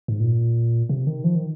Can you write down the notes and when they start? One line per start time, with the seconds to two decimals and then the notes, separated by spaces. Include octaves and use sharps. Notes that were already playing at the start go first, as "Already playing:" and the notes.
0.08 G#2
0.20 A#2
0.89 C3
1.07 D#3
1.24 F3
1.36 D#3